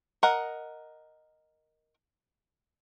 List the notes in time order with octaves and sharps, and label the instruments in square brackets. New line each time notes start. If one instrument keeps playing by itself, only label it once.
[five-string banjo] A#4 D#5 F#5